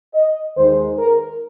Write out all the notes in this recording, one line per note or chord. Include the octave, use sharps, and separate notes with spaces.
D#5
D#2 D#3 G#3 D#4 C5
A#4